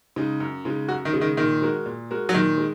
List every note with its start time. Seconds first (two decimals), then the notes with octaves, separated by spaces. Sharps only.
0.16 C#3 G#3 D#4
0.40 F#2
0.65 C#3 G#3 D#4
0.89 F#2 F#4
1.05 D#3
1.13 C#3 G#3 D#4
1.21 D#3
1.37 A#2 D#3
1.62 G#3 F#4 A#4
1.86 A#2
2.11 G#3 F#4 A#4
2.29 F#3
2.34 A#2 D#3
2.58 G#3